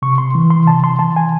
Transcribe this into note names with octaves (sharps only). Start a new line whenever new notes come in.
C3 C#6
C6
E3
C6
C3 A5
C6
E3 A5
G#5